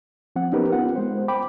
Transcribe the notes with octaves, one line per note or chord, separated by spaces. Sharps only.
F3 C4 F#5
B3 C#4 D#4 G4 A#4 B4
B3 F4 F#5
G#3 C5
G5 B5 D6